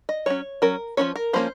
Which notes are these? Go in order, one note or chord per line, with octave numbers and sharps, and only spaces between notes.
D#5
F#3 C#4 C#5
F#3 C#4 A#4
F3 A#3 C#4 C#5
A#4
F3 A#3 C#4 C5